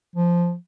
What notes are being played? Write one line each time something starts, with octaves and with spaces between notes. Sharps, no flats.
F3